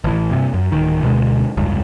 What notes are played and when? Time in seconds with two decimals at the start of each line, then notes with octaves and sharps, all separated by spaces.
0.04 A1 E3
0.31 G2 C3
0.54 F#2
0.72 D1 D#3
1.03 D2 B2 D3 G#3
1.57 F1 C#2 G2